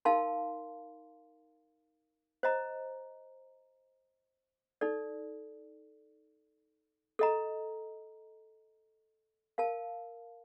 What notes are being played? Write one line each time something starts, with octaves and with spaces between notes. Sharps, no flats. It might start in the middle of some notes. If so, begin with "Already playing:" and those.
D#4 A#4 F5 A5 C6
C5 D#5 A#5
D#4 A4 D5
A4 D#5 A#5
A#4 F5 A5